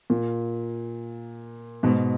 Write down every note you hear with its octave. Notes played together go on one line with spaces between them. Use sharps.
A#2
G#2 B2